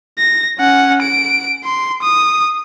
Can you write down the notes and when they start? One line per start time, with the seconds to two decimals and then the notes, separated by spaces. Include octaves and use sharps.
0.18 A#6
0.59 C#4 F#5
1.02 D7
1.65 C6
2.03 D#6